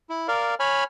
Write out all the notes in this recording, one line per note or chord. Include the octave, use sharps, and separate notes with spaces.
E4
A#4 D5 F5
C#5 G#5 B5 F6